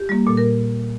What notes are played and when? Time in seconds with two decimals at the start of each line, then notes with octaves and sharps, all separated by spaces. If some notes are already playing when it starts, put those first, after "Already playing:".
Already playing: G4
0.09 G3 A#3
0.26 A#2 A4
0.37 A#4